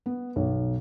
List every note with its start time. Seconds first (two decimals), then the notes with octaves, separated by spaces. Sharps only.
0.06 B3
0.36 B1